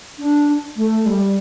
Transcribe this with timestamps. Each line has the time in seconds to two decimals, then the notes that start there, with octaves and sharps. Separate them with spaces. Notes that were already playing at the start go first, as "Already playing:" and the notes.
0.19 D4
0.77 A3
1.06 G3